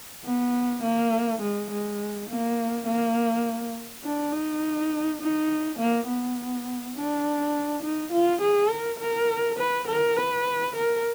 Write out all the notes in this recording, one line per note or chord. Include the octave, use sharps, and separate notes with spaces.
B3
A#3
G#3
G#3
A#3
A#3
D4
D#4
D#4
A#3
B3
D4
D#4
F4
G#4
A#4
A#4
B4
A#4
B4
A#4